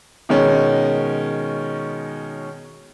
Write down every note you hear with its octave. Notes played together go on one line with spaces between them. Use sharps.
B2 D#3 G#3 C#4